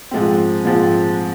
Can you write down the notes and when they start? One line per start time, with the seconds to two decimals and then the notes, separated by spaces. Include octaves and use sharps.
0.11 G#2 F3 G#3 C4
0.65 G#2 F3 G#3 C4